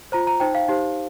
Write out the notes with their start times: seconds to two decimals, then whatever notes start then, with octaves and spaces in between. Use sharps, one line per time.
0.12 F4 C5 A#5
0.27 A#5
0.40 D#4 C5 G5
0.55 F5
0.68 D#4 G4 C5